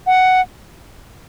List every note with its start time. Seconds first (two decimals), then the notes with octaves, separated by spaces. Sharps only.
0.07 F#5